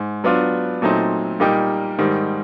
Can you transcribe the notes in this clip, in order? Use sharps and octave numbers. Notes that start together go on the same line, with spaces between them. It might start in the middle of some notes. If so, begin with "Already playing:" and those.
Already playing: G#2
F#3 B3 D4 F4
A#2 F#3 A3 C4 D#4
A#2 G3 A#3 D#4 G4
G#2 D#3 G3